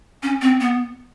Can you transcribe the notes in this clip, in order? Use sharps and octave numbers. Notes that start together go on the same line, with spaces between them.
C#4
C4
B3